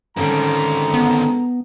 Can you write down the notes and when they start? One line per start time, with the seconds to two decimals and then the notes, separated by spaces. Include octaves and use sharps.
0.17 D3 D#3 G3 G#3 C4 C#4 A#5
0.94 B3